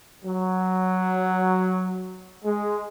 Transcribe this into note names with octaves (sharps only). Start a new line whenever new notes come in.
F#3
G#3